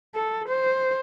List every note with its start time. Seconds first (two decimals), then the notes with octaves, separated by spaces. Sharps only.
0.15 A4
0.48 C5